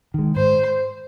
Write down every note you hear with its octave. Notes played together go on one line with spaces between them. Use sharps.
D#3 G#3
G#2 C5